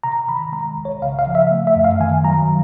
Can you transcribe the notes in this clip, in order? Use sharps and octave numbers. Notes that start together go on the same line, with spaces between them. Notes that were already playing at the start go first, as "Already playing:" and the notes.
C3 A#5
D#3 B5
G#3 A#5
C2
C#5
C#3 F5
F5
F3
E5
A3
E5
F#2
F5
D#3 G#5
F#3 A#5